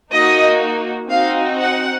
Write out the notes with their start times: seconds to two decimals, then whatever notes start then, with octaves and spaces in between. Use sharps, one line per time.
0.13 A#3 D#4 F#4 D#5
1.10 C4 D#4 F#4 F5
1.59 F#5